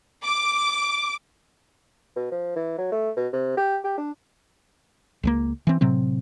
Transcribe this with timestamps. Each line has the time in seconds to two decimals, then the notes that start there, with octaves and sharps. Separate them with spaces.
0.24 D6
2.16 B2
2.31 F3
2.56 E3
2.78 F#3
2.92 A3
3.16 B2
3.33 C3
3.57 G4
3.84 G4
3.98 D4
5.23 C#2 G#3 A#3
5.67 E3 C4
5.81 A2 C3 F#3 C4